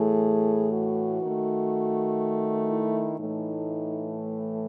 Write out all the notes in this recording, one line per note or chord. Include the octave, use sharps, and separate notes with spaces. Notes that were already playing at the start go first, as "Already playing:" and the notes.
Already playing: A2 E3 A3 G#4
F#4
D#3 A3
E4
A2 E3 A3 D#4